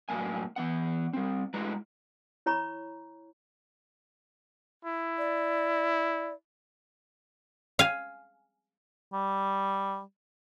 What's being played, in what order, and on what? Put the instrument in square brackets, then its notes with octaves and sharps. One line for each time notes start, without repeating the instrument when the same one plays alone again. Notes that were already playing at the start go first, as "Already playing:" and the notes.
[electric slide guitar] F#2 A2 A#3 G#5
E3 B3 F#5
G3 C4
G#3 A3 E4 B4 A#5
[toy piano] E4 C#5 A#5 B5 C#6
[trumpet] E4
[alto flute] D5
[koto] F5 G#5
[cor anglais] G3